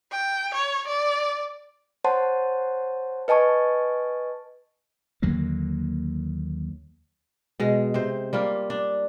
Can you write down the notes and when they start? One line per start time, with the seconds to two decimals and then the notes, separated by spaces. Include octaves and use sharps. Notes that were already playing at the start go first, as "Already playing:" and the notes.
0.12 G5
0.54 C#5
0.87 D5
2.04 C5 C#5 F#5 A5 C6
3.28 B4 D#5 G#5 A5 C#6
5.22 D#2 D3 F#3 A#3
7.60 B2 G#3
7.94 C3 C5
8.33 G3 A#3 F4
8.70 D4